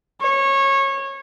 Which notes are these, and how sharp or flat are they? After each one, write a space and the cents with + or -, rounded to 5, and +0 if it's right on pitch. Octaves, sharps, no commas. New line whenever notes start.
C#5 -20